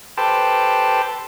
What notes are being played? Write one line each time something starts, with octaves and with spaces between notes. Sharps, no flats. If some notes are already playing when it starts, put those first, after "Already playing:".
G4 A4 B4 C5 G5 A5